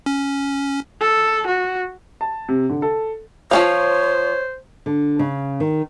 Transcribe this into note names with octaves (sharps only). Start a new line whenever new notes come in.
C#4
A4
F#4
A5
C3
D3
A4
F3 C#4 C5 C#5 F5
D3
C#3
D#3